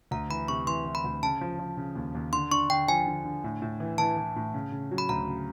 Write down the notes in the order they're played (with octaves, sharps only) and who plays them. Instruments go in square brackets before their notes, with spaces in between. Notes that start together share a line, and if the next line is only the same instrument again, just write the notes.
[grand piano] D2 [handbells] A#5
[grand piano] E3 [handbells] B5
[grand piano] C3 [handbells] C#6
[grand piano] E3 [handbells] C6
[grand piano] E3
[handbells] B5
[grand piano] D2
[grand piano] C#3 [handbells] A5
[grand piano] F3
F3
C#3
D#2
D#2
[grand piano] D3 [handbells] C6
[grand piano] D4 [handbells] C#6
[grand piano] D3 [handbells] G5
[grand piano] F3 [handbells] G#5
[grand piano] D3
D3
A2
A2
E3
[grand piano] E3 [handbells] A5
[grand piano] E3
A2
C#3
C#3
F#3
[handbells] B5
[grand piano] D2 [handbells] A#5
[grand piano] C#3